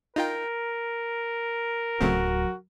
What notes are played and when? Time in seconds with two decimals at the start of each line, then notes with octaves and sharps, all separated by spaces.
0.16 D#4 F4 A#4 G5
2.01 D1 C#3 F#3 A3 C4 F#4